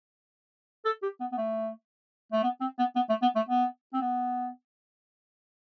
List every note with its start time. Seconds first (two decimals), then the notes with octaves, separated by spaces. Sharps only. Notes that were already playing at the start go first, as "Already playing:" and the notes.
0.85 A4
1.03 G4
1.20 B3
1.32 B3
1.38 A3
2.32 A3
2.43 B3
2.61 C4
2.79 B3
2.96 B3
3.09 A3
3.22 B3
3.36 A3
3.49 B3
3.94 C4
4.01 B3